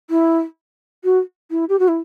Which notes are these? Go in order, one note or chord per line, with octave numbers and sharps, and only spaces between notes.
E4
F#4
E4
G4
F#4
E4